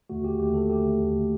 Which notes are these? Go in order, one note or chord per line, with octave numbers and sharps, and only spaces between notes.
D#2 D3 A3 F#4
G4
D#2 D3 A3 G4
A4
D#2 D3 A3 G4
D#2 D3 A3